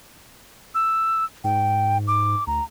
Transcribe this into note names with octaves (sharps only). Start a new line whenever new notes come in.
E6
G#2 G5
D6
D2 A#5